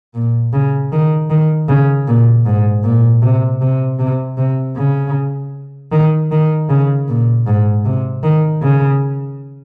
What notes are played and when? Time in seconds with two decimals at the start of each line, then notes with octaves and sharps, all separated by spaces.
0.14 A#2
0.53 C#3
0.92 D#3
1.30 D#3
1.68 C#3
2.08 A#2
2.46 G#2
2.84 A#2
3.22 C3
3.61 C3
3.99 C3
4.38 C3
4.77 C#3
5.92 D#3
6.31 D#3
6.69 C#3
7.08 A#2
7.47 G#2
7.85 C3
8.23 D#3
8.62 C#3